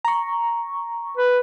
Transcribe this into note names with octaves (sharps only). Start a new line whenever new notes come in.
A#5 C#6
B4